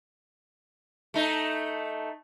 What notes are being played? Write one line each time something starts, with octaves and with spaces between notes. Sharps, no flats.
A3 D#4